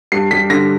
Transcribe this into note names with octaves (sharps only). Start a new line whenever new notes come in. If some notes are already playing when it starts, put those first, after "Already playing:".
G2 C7
G3 B6
D3 A#6